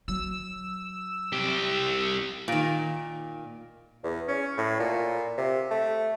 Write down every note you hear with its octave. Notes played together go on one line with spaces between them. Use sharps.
F#3 E6
C2 G4
A#2 D#3
E2
C#4
A2
A#2
C3
A3